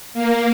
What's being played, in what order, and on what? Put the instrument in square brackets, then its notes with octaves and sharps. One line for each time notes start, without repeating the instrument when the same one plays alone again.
[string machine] A#3